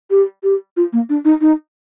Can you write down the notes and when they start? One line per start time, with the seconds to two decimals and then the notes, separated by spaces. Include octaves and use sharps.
0.11 G4
0.43 G4
0.77 F4
0.93 A#3
1.09 D4
1.25 D#4
1.41 D#4